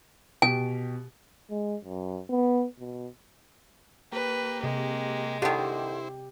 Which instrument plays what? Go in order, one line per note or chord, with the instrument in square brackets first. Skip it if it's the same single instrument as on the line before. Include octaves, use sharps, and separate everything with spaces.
[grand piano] B2 G4 [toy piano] G#5
[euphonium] G#3
F#2
B3
B2
[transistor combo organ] A#3 G4 [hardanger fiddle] B4
[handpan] C3 [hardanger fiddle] G#3
[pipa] D3 D#3 [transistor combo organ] E4 C5 [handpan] G4